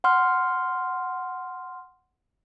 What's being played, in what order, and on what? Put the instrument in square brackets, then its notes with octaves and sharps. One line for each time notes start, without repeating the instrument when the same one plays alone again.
[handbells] F#5 C6 F6